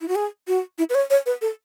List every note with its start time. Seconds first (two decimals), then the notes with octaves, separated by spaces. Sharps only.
0.01 E4
0.08 F#4
0.15 G#4
0.47 F#4
0.78 E4
0.89 B4
0.95 C#5
1.10 C#5
1.26 B4
1.41 A4